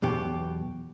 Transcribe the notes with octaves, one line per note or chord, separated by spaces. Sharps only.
B1 E2 B2 G4